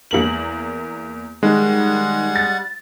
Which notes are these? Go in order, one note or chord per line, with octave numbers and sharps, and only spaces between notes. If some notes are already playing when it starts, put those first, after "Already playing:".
E2 A#3 F#7
D#3 G3 G#3 F#5
A6